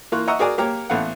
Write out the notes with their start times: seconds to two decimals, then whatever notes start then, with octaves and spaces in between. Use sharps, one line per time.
0.12 E3 A#3 F4 C#6 F#6
0.27 D#5 E5 F#5 A#5 C#6 E6
0.39 F#4 G#4 A#4 D5 G#5
0.58 A#3 G4 A#4 C#5
0.90 A1 B3 A4 F5 F#5